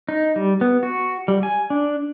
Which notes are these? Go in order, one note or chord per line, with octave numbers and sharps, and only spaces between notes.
D#4
G3
B3
F#4
G3
G#5
D4